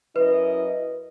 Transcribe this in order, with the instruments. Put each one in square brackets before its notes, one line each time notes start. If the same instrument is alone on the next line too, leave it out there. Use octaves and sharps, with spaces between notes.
[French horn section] F#2 E4 D#5 [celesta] B4